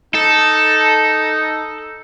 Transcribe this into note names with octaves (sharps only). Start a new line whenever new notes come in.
D#4 A4